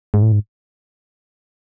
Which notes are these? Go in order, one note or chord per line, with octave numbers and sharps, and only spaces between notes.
G#2
A2
G#2